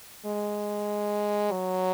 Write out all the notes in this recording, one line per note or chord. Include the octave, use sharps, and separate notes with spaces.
G#3
F#3